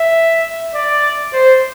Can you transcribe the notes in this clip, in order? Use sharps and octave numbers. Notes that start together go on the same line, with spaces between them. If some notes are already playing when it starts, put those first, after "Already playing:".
Already playing: E5
D5
C5